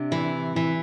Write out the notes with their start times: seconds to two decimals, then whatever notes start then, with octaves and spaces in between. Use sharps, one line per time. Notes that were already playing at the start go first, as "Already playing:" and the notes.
Already playing: C3 D4
0.12 E3
0.56 E3